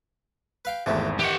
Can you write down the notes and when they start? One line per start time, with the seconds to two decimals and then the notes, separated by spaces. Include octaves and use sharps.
0.65 B4 F5 G5
0.86 G#1 E2 C3 E3 A3
1.19 D#3 E3 G4 F#5